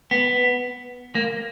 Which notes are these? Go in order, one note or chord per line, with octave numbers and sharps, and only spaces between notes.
B3
A#3